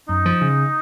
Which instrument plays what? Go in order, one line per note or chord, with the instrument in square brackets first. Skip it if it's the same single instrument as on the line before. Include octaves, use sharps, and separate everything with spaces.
[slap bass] F#2 [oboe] D#4
[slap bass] F3
C#3